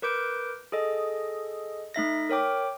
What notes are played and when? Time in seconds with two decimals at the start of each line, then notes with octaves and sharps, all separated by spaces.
0.02 A#4 B4 D6 G6 D7
0.72 G#4 A4 D#5
1.94 A3 D#4 E5 A#6
2.30 A#4 C#5 G5 D6